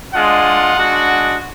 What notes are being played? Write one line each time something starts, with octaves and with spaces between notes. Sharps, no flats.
G#3 D4 F4 F#5
G#3 D4 F#4